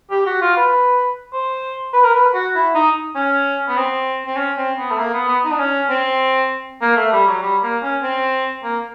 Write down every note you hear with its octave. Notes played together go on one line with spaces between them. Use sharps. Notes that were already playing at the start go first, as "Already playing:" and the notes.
G4
F#4
F4
B4
C5
B4
A#4
B4
F#4
E4
D#4
C#4
B3
C4
C4
C#4
C4
B3
A3
A#3
B3
B3
D#4
D4
C#4
C4
A#3
A3
G3
F#3
G3
A#3
C#4
C4
A#3